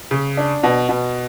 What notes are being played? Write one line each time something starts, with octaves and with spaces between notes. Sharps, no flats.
C#3
D4
B2
B2